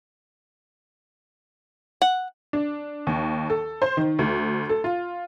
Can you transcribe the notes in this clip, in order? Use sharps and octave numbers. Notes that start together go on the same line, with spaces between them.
F#5
D4
D#2
A4
C5
D#3
D2
A4
F4